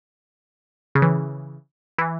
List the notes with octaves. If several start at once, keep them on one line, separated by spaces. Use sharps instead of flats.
C#3
E3
E3